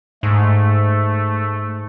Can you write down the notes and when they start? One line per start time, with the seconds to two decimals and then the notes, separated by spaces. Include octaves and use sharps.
0.23 G#2 A3